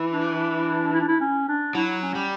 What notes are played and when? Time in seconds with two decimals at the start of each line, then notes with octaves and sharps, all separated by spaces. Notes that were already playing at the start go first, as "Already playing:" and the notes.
Already playing: E3
0.12 D4
0.93 E4
1.00 D4
1.08 E4
1.20 C#4
1.48 D4
1.75 F#3 E4
2.02 C#4
2.15 G3